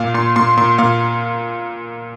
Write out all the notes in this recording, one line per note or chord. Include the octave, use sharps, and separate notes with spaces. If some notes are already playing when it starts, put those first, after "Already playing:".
Already playing: A#2 F5
A#2 C6
A#2 C6
A#2 C6
A#2 F5